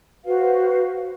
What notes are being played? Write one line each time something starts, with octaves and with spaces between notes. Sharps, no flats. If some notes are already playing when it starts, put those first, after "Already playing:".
F#4 B4 C5 F5